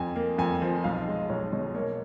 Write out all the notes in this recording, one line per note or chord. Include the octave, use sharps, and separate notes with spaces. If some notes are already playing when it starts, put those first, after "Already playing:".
Already playing: F2 G#5
A#3
F2 G#5
F3
B1 F5
G#3 D#5
B1 C#5
B2 C#5
A#3 C#5